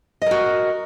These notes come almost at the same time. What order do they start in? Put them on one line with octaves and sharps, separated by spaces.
D#5 A#4 F#4